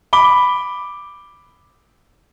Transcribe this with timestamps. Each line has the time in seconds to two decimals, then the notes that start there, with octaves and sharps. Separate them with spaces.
0.13 B5 D6 G7